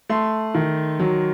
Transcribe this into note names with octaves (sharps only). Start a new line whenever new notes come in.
A3 C6
D#3
F#3